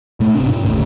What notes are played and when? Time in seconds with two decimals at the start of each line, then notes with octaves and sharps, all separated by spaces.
0.20 A#2 A3
0.34 G1 C3 D4
0.46 G2 B2
0.63 G1 D#2 A2 C#3